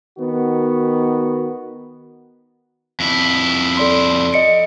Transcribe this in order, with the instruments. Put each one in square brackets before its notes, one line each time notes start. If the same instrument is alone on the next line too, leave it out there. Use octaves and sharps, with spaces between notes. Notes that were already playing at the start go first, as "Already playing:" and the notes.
[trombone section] D#3 B3 F#4
[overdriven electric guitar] F2 E4
[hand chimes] A4 D5 C6
D#5 C#7 D7